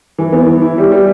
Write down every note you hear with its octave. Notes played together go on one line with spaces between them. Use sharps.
E3
B3
E3
E4
G3
G3